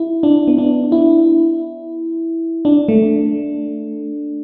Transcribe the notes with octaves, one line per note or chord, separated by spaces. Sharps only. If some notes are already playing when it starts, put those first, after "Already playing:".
Already playing: E4
D4
B3
D4
E4
D4
A3